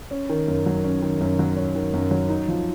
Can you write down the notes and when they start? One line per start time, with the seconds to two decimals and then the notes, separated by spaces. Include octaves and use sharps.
0.11 C#4
0.29 D#3
0.48 F#2
0.66 F#3
0.84 C#4
1.02 D#3
1.21 F#2
1.39 F#3
1.57 C#4
1.75 D#3
1.93 F#2
2.11 F#3
2.30 D#4
2.48 F3